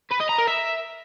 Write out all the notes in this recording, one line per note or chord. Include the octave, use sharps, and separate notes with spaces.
B4
D#5
A#5
A#4
E5